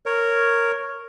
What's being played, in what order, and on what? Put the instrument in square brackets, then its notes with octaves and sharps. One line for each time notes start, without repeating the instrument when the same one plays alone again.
[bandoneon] A#4 C#5